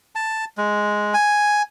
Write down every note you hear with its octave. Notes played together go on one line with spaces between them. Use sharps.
A5
G#3
G#5